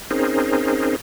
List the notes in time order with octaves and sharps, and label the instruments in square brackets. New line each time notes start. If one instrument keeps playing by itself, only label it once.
[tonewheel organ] C4 C#4 D#4 G#4 A#4 C5